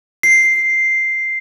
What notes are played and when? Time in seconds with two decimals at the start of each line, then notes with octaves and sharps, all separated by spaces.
0.23 C7